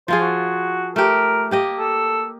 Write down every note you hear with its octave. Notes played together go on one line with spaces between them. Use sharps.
F3 F4 G#4 C5
F#4
A3 G4 A#4
A#3 G4 D#5
A4